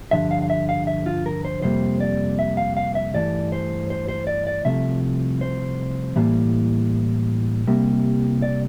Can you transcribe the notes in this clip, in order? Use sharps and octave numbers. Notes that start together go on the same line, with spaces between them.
G2 D3 F3 E5
F5
F5
E5
F5
E5
F4
A#4
C5
F2 C3 G3 A#3 C5
D5
E5
F5
F5
E5
G2 E3 A3 D5
C5
C5
C5
D5
D5
C2 C3 F3 A3 E5
C5
A2 E3 G3 A#3
C2 C3 G3 A#3
D5